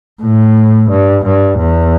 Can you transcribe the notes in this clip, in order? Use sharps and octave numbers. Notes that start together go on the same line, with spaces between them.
A2
G2
G2
E2